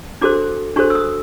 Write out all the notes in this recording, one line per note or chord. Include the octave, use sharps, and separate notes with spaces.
D4 F#4 A4 C5 D6
D4 F#4 A4 C5 C#6
E6
D#6